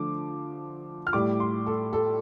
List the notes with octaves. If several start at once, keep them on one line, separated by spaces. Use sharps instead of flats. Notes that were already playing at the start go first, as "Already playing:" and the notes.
Already playing: D3 F3 A3 D6
F6
A2 G3 D6
C6
A4
A4